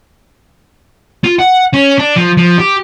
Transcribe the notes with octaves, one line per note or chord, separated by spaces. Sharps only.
F4
F#5
C#4
D4
F3
F3
G4